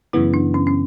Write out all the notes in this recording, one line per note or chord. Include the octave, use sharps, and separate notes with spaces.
F#2 C#3 E3 B3 E4
D4
C#4
C#4